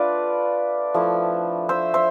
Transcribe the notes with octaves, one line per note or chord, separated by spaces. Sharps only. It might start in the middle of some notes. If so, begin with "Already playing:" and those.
Already playing: A3 D4 F4 B4 D5
F3 A3 E4
C5 E5
C5 E5